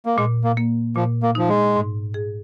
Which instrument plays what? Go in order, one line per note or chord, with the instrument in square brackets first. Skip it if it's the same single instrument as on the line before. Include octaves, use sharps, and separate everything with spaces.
[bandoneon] A#3
[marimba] A#2 [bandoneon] G#3
[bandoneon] A#3
[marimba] A#3
[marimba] A#2 [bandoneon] F3
[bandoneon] A#3
[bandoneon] F3 [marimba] D#4
[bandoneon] G#3
[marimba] G#2
G#4